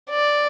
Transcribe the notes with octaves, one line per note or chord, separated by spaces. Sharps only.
D5